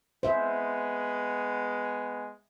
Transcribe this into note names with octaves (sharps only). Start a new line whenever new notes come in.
G#3 B3 C5 E5